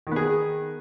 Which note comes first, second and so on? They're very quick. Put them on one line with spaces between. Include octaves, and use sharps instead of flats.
D#3 B3 G#4